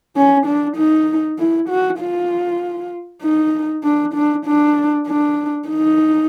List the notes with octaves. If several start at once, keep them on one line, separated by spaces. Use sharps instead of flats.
C#4
D4
D#4
E4
F#4
F4
D#4
D4
D4
D4
D4
D#4